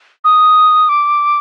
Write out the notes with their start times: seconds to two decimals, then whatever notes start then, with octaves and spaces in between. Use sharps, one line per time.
0.24 D#6
0.89 D6